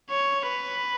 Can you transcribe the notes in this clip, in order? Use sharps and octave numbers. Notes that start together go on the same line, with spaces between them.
C#5
B4